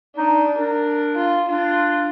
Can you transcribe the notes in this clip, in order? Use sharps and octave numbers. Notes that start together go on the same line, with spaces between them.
D4 D#4
D4 A#4
F4
D4 F4